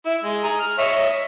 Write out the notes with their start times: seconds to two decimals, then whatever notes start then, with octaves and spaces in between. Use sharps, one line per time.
0.05 E4
0.23 G#3
0.44 G#4 A#5
0.60 F6
0.78 C#5 D#5 E5